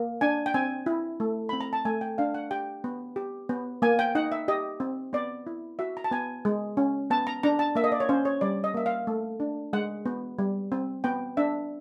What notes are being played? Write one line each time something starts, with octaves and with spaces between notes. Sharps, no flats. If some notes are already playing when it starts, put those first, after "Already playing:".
Already playing: A#3
D4 G#5
G5
C4 G#5
E4
A3
C4 B5
A#5
A5
A3 G#5
G5
D4 F5
F#5
G4 G5
B3
G4
B3
A#3 G#5
G5
D#4 F#5
E5
G4 D#5
C4
B3 D5
E4
F#4 E5
A#5
A5
B3 G#5
G#3
C#4
B3 A5
A#5
D4 A#5
A5
A#3 E5
D#5
D5
C#5
C#4 C5
C#5
G3 D5
D#5
A#3 E5
F5
A3
D4
G#3 F#5
B3
G3
C4
B3 G5
D4 E5